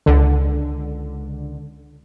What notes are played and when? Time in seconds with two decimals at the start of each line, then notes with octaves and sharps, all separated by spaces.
0.06 C#2 D3